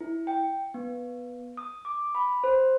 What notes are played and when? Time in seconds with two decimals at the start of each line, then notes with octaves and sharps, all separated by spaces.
0.01 E4
0.27 G5
0.74 B3
1.57 D#6
1.85 D6
2.15 B5
2.44 C5